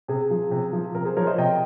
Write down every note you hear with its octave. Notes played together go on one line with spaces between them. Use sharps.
C3 G#4
F3
C3
F3
C3 A#4
G#4 C5
F3 A#4 C#5
C5 D#5
C3 D#5 G5